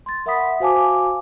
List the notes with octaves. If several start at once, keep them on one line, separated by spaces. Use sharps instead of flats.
C6 A6
A#4 E5 F#5 B5 D#6 B6
F#4 C5 F5 G#5 A5 D6